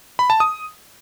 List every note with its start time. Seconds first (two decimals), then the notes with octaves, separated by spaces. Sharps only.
0.19 B5
0.30 A5
0.40 D#6